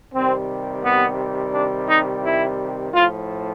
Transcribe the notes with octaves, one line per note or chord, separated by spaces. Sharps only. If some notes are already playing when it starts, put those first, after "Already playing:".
C3 D#3 G3 C4
B3
D4
D#4
E4
A2 F3 F4